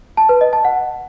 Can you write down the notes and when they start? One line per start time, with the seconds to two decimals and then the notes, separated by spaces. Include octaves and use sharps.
0.17 A5
0.29 B4
0.41 D#5
0.53 A5
0.65 F#5